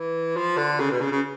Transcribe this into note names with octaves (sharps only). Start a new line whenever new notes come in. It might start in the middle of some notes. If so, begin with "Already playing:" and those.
Already playing: E3
F3
D3
C#3
B2
C#3
C#3